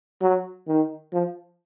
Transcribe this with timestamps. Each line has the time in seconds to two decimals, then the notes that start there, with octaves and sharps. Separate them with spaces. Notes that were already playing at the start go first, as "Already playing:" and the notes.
0.22 F#3
0.67 D#3
1.13 F3